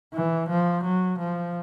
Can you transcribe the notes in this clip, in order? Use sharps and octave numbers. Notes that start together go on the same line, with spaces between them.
E3
F3
F#3
F3